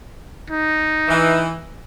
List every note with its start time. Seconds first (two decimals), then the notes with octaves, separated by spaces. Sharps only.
0.50 D#4
1.08 E3